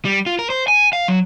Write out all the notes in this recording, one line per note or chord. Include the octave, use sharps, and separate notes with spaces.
G3
F4
A#4
C5
G#5
F5
F#3